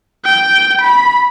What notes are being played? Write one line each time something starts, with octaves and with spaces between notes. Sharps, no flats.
G5
B5